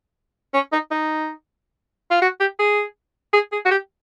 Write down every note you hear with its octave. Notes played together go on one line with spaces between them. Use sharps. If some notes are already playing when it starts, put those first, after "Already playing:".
C#4
D#4
D#4
F4
F#4
G4
G#4
G#4
G#4
F#4
G4